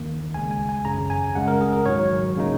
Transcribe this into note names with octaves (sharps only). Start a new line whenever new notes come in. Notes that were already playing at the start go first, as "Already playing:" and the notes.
Already playing: D#2 D#3 A#3
C#2 C#3 G#3 G#5
G#5
G#5
G#1 F#2 C#3 A#5
G#5
C#2 C#3 G#3 F#5
A#4
G#4
A#4
G#1 G#2 F#3 C#5
C#3 A#3 D#4